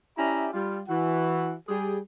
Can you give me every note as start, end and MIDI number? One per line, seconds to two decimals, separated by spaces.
0.17 0.48 61
0.17 0.48 64
0.17 0.48 67
0.17 0.48 74
0.17 0.48 76
0.17 0.48 82
0.53 0.81 55
0.53 0.81 65
0.87 1.54 52
0.87 1.54 66
0.87 1.54 78
1.68 1.98 55
1.68 1.98 68